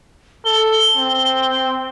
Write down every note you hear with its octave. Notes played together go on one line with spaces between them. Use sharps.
A4 G7
C4